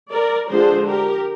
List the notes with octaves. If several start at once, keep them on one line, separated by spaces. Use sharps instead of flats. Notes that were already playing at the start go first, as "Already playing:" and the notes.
A#4 D5
D3 F3 G#3 D4 G#4 C5
G4 A#4